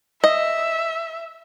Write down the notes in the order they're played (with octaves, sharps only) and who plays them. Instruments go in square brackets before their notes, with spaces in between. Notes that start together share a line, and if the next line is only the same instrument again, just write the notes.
[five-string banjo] D#5 [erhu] E5